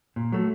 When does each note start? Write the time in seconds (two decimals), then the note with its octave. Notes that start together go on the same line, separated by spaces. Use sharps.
0.16 A#2
0.32 F#3 A3